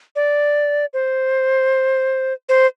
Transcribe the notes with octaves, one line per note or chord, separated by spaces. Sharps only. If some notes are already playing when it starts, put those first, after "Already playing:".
D5
C5
C5